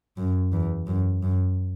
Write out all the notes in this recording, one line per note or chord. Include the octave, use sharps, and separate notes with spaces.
F#2
E2
F#2
F#2